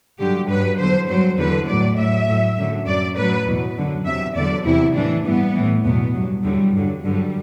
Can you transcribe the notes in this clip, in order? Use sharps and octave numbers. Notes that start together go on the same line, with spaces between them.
G2 D3 F#3 G4
G2 F#3 B4
E2 D3 F#3 C5
G2 F#3 C5
E2 D3 F#3 B4
A2 F#3 D5
A2 F#3 E5
A2 F#3
F#2 D3 F#3
F#2 F#3 D5
A2 F#3 B4
E2 B2 F#3
F#2 D3 F#3
E2 C3 F#3 E5
E2 D3 F#3 D5
E2 C3 E3 E4
A2 E3 D4
G2 E3 B3
A2 E3
E2 B2 F#3 B3
G2 F#3
E2 D3 F#3 G3
G2 D3 F#3
G2 D3 F#3 G3